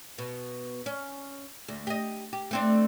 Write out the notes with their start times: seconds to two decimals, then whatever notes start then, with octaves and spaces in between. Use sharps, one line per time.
0.18 B2
0.86 C#4
1.68 D2
1.87 G4 D#5
2.33 G4
2.51 A3 C4 D4